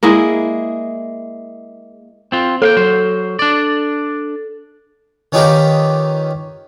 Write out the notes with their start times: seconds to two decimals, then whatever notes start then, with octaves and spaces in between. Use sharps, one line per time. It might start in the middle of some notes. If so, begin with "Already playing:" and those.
0.03 G#3 A#3 E4 G#4
2.32 C4 F4
2.62 A#3 A4 F5 G5
2.77 F#3 C5
3.39 D4 D5
5.32 D#3 C#4 D#4 F4 G4 B4